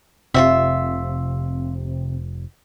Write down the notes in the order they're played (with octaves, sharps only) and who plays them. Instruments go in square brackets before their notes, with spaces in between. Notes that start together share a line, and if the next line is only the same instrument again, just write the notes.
[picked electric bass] F1 [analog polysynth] C3 [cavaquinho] F4 F#4 E5